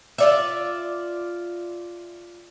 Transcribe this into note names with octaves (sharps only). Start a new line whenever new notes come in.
F4 D5 E5